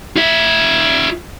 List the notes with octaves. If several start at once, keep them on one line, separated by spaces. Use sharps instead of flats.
F4 E5